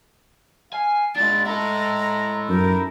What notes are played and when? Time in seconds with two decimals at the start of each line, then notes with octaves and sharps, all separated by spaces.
0.73 F5 G#5
1.16 G#3 D4 F4 A6
1.46 E4 A4 A#5
2.49 F#2 D#4 A#4